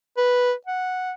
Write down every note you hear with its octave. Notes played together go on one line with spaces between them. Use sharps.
B4
F#5